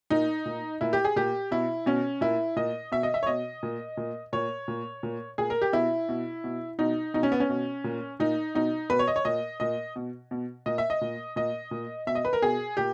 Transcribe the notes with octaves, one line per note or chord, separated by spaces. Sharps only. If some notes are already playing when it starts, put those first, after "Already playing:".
A#2 D#4
A#2
A#2 E4
G4
G#4
A#2 G4
B2 E4
B2 C#4
A#2 E4
A#2 D#5
B2 E5
D#5
E5
C#5
B2 D#5
A#2
A#2
A#2 C#5
A#2
A#2
A#2 G#4
A#4
G4
B2 E4
B2
B2
B2 D#4
B2 D#4
C#4
B3
C#4
B2
A#2
A#2 D#4
B2 D#4
B2 B4
C#5
D#5
C#5
A#2 D#5
A#2 D#5
B2
B2
A#2 D#5
E5
D#5
A#2
A#2 D#5
A#2
B2 E5
D#5
B4
A#4
B2 G#4
A#2 G4